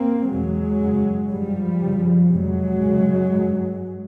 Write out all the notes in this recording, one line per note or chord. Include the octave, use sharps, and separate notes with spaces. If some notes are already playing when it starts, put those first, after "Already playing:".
Already playing: A#3 C4
E2 B2 F#3 G#3
F#2 C#3
G2 F3 G3
F#2 C#3
F2 C3 F#3 G#3
F#2 C#3
G2